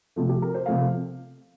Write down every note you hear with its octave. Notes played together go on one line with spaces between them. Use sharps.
C3 F3 A3
G4
A#4
C5
C3 F3 A3 F5